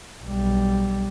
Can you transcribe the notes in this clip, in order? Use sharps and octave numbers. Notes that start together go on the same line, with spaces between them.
B1 G3